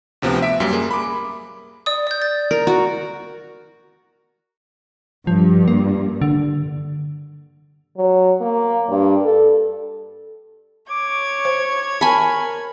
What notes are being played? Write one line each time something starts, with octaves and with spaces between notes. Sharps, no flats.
D2 C3 F3 B3
E5 B6 D7
F#2 G3 A#3
A#3 G#4
B5 D6
D5 D#6
D5 G6
A6
A#4
F#4
G2 F3
A#3
D3
F#3
A#3
G2
A4
C#5 C#6 D6 G#6
C5
A#4 G#5 A5 B5